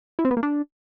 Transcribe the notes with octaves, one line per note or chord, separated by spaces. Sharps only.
E4
C4
B3
A#3
D4